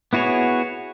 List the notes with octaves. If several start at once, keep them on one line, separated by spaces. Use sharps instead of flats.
B3 E4 F#4 G#4 C#5